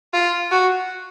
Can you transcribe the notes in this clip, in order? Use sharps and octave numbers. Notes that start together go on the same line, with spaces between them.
F4
F#4